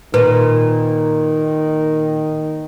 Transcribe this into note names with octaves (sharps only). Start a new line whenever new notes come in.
A#2 D#3 B4